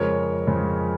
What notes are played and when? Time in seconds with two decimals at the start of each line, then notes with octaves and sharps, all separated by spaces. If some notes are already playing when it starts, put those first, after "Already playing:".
Already playing: F2 C#3 G#3 A#4 C#5
0.47 F2 C#3 G#3